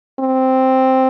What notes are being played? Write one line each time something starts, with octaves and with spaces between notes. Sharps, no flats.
C4